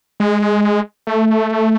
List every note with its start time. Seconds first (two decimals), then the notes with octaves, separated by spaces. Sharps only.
0.20 G#3
1.07 A3